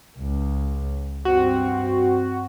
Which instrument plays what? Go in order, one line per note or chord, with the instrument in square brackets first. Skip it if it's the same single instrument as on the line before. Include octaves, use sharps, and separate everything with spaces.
[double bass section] C#2
[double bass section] G2 C4 [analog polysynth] F#4